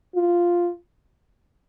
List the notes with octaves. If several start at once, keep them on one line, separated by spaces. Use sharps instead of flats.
F4